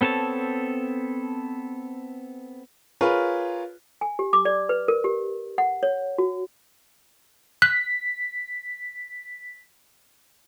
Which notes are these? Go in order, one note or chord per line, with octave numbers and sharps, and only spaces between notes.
B3 C4 A4 C#5 A5
F4 G#4 A#4 B4 C#5
G#5
G4
D6
D5
B4
A#4
G4
F#5
C#5
F#4
F#6 B6